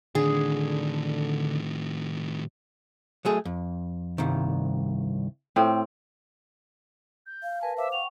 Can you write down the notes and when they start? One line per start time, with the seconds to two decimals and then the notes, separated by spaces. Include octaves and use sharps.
0.15 A2 D3 D#3 G#4
3.25 F#3 A3 G#4
3.45 F2
4.18 C2 G2 D#3
5.56 A2 C4
7.26 G6
7.43 F5
7.61 A#4 B4 G#5 A5
7.77 C5 E5 F5 D6
7.92 F#5 G5 C#6 F7